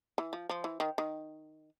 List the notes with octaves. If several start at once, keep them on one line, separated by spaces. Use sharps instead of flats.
E3
F3
F3
E3
D#3
D#3